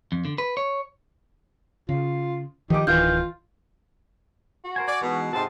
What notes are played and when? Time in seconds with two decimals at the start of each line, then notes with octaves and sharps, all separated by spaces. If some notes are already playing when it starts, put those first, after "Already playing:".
0.12 F2
0.25 D3
0.38 B4
0.57 C#5
1.89 C#3 F4
2.70 D#3 F3 D#4 G4 D6
2.87 D1 D#3 E3 F4 F6 G6
4.64 F#4
4.76 A#4 C5 G#5
4.88 D5 G#5
5.01 B2 E3 G#3 D#4
5.33 G#2 C3 D#4 F#4 C5 A5